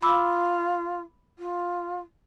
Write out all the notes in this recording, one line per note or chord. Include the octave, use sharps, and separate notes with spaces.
F4 B5 D6 E6
F4